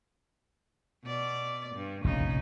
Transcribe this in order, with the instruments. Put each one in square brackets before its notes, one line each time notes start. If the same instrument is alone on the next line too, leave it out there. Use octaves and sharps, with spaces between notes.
[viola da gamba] B2 D5
G2
[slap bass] F1 A#1 E2 [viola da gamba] C#3 D#4